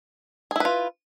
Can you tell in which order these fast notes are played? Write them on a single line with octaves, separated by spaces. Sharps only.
G#4 E4 B4 F4